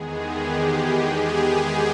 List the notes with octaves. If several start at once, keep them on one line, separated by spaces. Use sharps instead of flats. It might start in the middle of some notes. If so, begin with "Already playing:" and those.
Already playing: E2 D#3 G#3 B3 G#4
G4
G#4